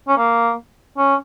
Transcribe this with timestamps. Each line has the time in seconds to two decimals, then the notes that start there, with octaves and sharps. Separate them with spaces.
0.08 C#4
0.17 A#3
0.97 C#4